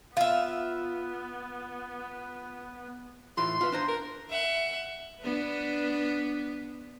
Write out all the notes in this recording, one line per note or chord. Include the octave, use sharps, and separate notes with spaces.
B3 F4 E5 F5
A2 E3 F4 C6
F4 B4 E5
D4 C5 A#5
A#4
E5 F#5
B3 D4 B4